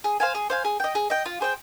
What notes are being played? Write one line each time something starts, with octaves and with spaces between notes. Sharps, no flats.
G#4
C5 F5 G#5
G#4
C5 F5 G#5
G#4
D#5 G5
G#4
D#5 G5
F4
G#4 C5 G5